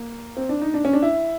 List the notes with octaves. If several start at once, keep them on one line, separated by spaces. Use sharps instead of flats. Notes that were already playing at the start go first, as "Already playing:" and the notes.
Already playing: A#3
C4
D4
D#4
D4
C#4
D4
E4